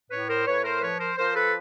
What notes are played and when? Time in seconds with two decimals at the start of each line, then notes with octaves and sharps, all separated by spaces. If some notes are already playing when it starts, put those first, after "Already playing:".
0.10 A2 B4 C#5
0.29 A#4 C5
0.46 A2 B4 C#5
0.64 A#4 C5
0.81 F3 B4 C#5
0.99 A#4 C5
1.17 F3 A#4 C5
1.35 A4 B4